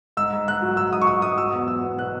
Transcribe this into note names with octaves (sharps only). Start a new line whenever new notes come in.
G#2 E6
G#2
G#2 F#6
F#3
G#2 E6
G#2 D#6
C#6
F#3 D#6
G#2 D#6
F#3 E6
E2
F#3 E6
E2
B2 F#6